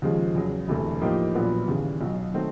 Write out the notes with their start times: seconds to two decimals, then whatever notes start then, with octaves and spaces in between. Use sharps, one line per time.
0.02 D#2 C#3 F3 G#3
0.35 E2 C#3 F#3
0.68 E1 D2 C3 E3 A3
1.01 A2 F3 A#3 D#4 G4
1.35 A#1 A#2 F#3 B3
1.68 D#2 C#3 E3
2.01 B1 B2 F#3
2.34 D#3 F#3 A3 C4